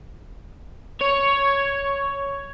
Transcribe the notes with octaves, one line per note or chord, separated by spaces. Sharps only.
C#5